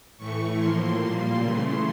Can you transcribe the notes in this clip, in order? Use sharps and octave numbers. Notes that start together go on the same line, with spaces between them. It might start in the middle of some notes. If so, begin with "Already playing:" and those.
A2 E3 A3 C#6
A2 F3 A#3 C6
A#2 G3 A#3
C#3 E3 A3